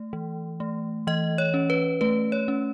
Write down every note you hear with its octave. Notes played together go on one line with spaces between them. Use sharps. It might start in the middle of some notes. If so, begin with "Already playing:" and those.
Already playing: A3
E3
A3
E3 D#5
C#5
C#4
B4
A3 B4
C#5
C#4